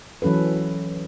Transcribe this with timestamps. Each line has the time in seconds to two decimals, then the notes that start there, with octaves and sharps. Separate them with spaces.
0.22 E3 F#3 C#4 A4 B4